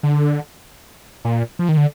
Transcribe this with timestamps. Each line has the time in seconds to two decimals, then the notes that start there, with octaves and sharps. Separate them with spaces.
0.03 D3
1.25 A#2
1.59 F3
1.69 D#3
1.77 D3